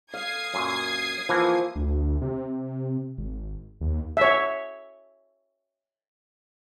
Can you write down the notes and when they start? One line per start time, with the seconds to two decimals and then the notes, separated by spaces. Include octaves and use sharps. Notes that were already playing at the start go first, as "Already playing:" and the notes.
0.14 F5 D#6 G#6 C7
0.54 F#2 A#2
1.29 E3 F3 A#3
1.76 D2
2.22 C3
3.18 G#1
3.81 D#2
4.17 C#5 E5